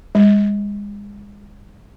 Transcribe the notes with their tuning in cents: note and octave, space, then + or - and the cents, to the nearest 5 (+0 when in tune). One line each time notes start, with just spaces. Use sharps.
G#3 -30